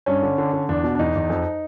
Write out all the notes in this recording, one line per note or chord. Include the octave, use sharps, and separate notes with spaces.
G2 C#4
D3
D3
D3
E2 D4
B2
D4
E2 D#4
E2
F2